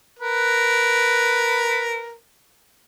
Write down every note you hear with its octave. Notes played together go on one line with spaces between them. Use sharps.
A#4 B4